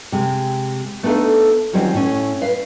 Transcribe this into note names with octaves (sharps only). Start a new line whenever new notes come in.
C3 G#3
A3 B3 D4 D#4 A4 F5
D#3 F#3 G3 C4 C#4 F4
A2 C#4
B4 F5